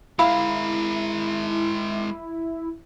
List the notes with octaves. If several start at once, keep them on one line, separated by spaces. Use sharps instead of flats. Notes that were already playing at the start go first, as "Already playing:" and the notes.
G#3 E4 A#4 F5 B5